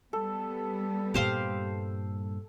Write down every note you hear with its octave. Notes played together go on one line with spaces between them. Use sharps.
G3 B3 A4
G2 A#2 G4 C5 F5